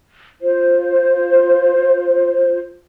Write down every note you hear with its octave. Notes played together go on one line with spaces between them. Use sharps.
F4 C5